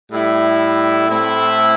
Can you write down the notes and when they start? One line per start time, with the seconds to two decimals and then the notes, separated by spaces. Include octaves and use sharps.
0.11 A2 G3 E4
1.09 A2 A3 C4 E4